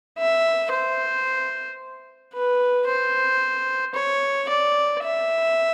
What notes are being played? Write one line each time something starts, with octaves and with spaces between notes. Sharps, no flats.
E5
C5
B4
C5
C#5
D5
E5